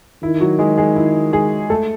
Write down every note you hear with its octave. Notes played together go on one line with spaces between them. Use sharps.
D#3 E4
F#3 F#4
G#3 G#4
G#3 G#4
E4
G#3 G#4
A3 A4